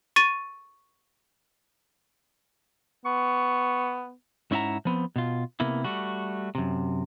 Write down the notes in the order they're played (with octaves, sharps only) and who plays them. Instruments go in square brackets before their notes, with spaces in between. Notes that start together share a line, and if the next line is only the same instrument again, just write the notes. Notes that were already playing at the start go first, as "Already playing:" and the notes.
[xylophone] C#6 A6 D#7
[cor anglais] B3 [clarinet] C#6
[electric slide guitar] G#2 C#4 E4 E5 F#5 A#5
F3 B3 C4
B2 F4
C3 A#3 B3 E4
G3 A3 F#4
F#2 C3